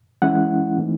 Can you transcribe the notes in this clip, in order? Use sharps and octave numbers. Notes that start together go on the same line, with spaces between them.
E3 G#3 C#4 E4 F#5
E3 A3 C4 D#4